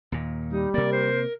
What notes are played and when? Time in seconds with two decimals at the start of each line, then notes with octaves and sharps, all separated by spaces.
0.12 D#2 A#2
0.50 G3 D#4
0.74 C3 A#3 A#4 D5
0.93 C5